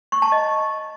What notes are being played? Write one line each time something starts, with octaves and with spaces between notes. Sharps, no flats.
C#6
A5
D#5